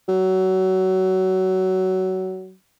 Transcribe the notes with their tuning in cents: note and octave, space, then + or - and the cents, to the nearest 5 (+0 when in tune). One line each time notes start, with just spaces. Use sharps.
F#3 +20